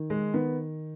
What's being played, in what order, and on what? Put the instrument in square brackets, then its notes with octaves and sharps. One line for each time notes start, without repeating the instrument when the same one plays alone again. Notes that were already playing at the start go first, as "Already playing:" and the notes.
Already playing: [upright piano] D#3
[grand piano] G#3
[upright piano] D#3 [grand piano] B3